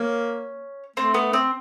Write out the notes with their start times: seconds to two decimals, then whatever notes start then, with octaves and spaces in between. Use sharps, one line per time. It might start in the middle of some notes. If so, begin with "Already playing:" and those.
Already playing: A#3 C#4
0.96 A3 C4
1.14 B3
1.33 C4